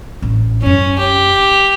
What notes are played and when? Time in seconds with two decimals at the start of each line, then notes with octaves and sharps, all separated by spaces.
0.22 A1
0.62 F#2 C#4 E4
0.99 G4